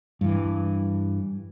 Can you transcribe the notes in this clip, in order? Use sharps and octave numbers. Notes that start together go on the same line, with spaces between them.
G2 E3